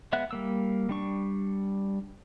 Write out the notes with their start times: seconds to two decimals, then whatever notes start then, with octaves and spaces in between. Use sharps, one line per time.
0.13 G#3 B3 E5 F#5 F#6
0.31 G3 A#3 E6
0.89 G3 D4 C#6